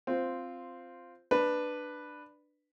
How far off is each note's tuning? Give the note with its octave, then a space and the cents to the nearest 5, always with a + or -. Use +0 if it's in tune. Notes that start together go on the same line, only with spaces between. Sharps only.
C4 +0 F4 +0
D4 +15 B4 +0